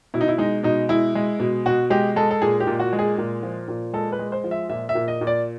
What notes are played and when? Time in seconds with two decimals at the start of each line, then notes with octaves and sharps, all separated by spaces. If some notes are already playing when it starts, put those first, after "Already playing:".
0.14 B2 E4
0.21 D#4
0.28 E4
0.38 G#3 D#4
0.63 B2 D#4
0.89 G#3 E4
1.15 G#3
1.40 B2
1.66 B2 F#4
1.90 G#3 G4
2.16 G#3 A4
2.31 A4
2.42 A#2 G#4
2.60 G4
2.67 A#2
2.80 F#4
2.93 G#3
2.99 G#4
3.18 A#2
3.43 F3
3.68 A#2
3.93 G#3 A4
4.12 B4
4.19 G#3
4.32 C5
4.44 F3
4.51 E5
4.69 A#2 E5
4.89 E5
4.95 A#2
5.08 D#5
5.21 A#2
5.27 D5